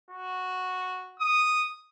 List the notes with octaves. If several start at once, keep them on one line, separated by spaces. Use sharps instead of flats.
F#4
D#6